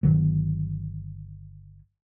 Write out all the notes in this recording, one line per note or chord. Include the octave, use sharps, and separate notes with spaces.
G1 C2 D#3 F#3